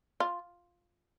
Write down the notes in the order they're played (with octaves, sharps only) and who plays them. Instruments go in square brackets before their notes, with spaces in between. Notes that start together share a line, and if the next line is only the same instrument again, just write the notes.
[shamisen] F4